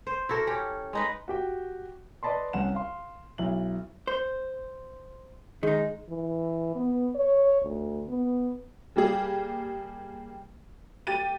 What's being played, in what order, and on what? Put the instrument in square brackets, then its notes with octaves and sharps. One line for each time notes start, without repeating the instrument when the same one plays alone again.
[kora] C5
E4 F#4 A4 A#4
C#4 G4
G#3 D#4 B4
[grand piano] F#4 G4 G5
B4 D5 D#5 A5 B5 C6
C2 C#4 F#5 E7
F5 C6
B1 E4 F#7
[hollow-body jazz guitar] C5
[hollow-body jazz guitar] D#3 D#4 [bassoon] G#3
[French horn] E3
B3
C#5
D2
B3
[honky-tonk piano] G3 A#3 G4 G#4
G4 A6 D#7